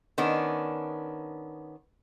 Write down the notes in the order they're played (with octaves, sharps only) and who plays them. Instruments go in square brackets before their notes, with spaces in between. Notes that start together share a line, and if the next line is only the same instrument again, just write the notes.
[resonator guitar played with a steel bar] D#3 B3 C#4 D4